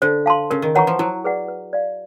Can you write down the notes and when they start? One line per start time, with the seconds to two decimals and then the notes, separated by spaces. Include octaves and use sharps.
0.02 D3 C5
0.26 F5 A5 C6
0.51 C#3 A#4
0.62 D#3
0.75 E3 C#5 F#5 A#5 C#6
0.87 F3
0.99 F#3 E4
1.24 G#4 B4 D5 F#5
1.48 B4
1.73 D5 F5